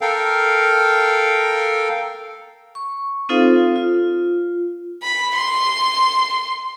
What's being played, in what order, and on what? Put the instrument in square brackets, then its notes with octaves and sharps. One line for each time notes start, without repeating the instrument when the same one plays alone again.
[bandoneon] A4 A#4 F5 G5
[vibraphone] C#6
C4 D#4 F4 A4 C5 F5
F4
[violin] B5
C6